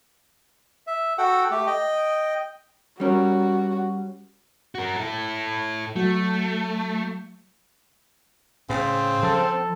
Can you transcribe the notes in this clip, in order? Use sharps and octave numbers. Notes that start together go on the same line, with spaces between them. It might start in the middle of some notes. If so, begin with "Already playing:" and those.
E5
F#4 A4 F#5 G5
A3 G4
D#5 G5
G3 C#4 F#4 A#4
F#4 A#4
E4 A4
F#3 A3
A2 C#3 C4
F3 A4